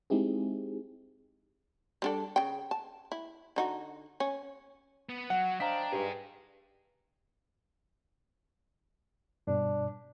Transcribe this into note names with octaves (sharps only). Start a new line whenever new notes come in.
G#3 C4 D#4 E4 G4 G#4
G3 D4 A4
C#3 G5
A5
E4
D3 D#4 F#4
C#4
B3
F#3 F#5
D4 C5 D#5 F5 G5 A#5 B6
G2 D#4 G#4
G2 B2 D4